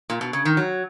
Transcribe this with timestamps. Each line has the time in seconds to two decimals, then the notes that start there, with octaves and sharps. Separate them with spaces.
0.10 A#2
0.21 B2
0.33 C#3
0.45 D#3
0.57 F#3